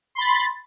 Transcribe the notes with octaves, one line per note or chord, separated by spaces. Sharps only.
B5 C6 A6